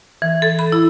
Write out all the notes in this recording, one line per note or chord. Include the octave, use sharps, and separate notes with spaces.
E3
A4
B5
E4